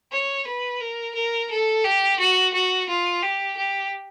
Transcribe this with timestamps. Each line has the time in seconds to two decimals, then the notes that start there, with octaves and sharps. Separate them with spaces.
0.12 C#5
0.47 B4
0.81 A#4
1.15 A#4
1.51 A4
1.84 G4
2.20 F#4
2.53 F#4
2.89 F4
3.23 G4
3.57 G4